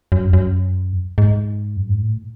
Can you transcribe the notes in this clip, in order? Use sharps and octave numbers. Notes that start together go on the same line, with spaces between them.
F#2
F#2
G#2
F#2
G#2
A2